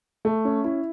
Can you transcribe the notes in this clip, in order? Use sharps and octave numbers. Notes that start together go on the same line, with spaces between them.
A3
C#4
E4